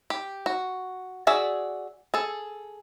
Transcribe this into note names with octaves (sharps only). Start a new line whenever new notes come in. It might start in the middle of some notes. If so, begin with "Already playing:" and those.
G4
F#4
F#4 G#4 D5 E5
G#4 A4